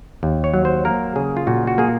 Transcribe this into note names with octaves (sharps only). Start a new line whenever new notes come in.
D#2
C#5
F#3
C5
A#3 A#4
C#3 G#4
F4
A#2 F#4
F#4
A#3 G#4